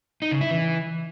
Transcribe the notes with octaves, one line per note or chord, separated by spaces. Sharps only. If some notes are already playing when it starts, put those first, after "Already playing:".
D#4
C#3
E4
E3